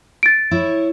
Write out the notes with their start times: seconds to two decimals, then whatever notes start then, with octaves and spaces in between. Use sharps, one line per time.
0.23 A6 D7
0.51 E4 C#5